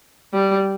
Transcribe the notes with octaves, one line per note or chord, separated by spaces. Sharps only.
G3